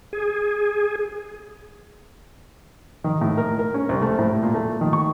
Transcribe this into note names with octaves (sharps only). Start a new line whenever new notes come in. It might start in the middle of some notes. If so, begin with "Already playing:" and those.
G#4
D#3
A2
A#4
A#4
C#4
C2
A3
A2
A#2
A3
D#3
C#6